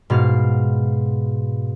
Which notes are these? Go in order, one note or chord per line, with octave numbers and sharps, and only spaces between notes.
G#2 B2 F5